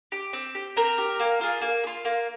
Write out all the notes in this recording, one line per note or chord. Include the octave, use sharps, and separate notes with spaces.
G4
C4
G4
C4 A#4
G4
A#3
F4 G#4
A#3
G#4
F4
A#3